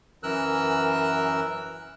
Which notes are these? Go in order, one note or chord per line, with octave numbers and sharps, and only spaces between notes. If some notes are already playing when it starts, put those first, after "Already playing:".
F#2 E3 A#4 E6 F#6